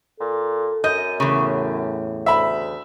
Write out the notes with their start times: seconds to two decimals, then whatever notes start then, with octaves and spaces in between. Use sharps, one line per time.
0.20 A#2 A4
0.84 F#2 D#5 G6
1.20 E2 A2 C#3
2.26 D2 E5 B5